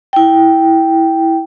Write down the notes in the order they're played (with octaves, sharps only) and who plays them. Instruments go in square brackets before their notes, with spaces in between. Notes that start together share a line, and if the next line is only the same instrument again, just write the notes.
[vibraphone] E4 G5